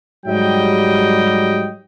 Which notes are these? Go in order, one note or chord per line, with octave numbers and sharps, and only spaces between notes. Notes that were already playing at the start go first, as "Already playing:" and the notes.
G#2 F#3 G3 G4 D#5 G5